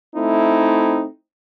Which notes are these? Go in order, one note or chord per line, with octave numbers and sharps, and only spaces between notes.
A3 C4 D#4 E4